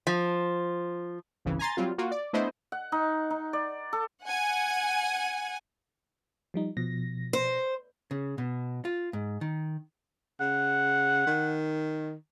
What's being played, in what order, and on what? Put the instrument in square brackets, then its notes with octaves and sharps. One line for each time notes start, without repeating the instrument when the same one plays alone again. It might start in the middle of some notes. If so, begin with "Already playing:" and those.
[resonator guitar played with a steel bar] F3
[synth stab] G1 C2 C#3 E3
G#5 A#5 C6 A6
F#3 G3 C4 F4
A#3 F4 F#4
D5
A3 B3 D4 E4 C5 D#5
[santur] F#5
D#4
D#4
D5
A4
[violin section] F#5 G#5
[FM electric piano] F3 G3 D#4
B2 F3 A#6
[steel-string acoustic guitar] C5
[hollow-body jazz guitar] C#3
B2
F4
G#2
D#3
[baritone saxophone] C#3 [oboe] F#5
[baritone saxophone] D#3